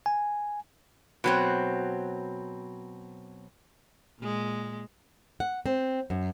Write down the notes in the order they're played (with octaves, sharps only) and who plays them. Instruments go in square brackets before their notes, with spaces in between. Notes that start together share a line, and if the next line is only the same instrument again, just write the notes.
[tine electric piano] G#5
[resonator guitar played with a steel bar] B2 F#3 C4
[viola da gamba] A#2 G#3
[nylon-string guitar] F#5
C4
F#2